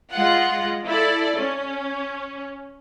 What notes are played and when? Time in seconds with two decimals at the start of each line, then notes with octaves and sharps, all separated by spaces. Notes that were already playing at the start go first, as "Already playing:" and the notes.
0.13 G#3 F4 F#5
0.87 E4 A4 D5
1.37 C#4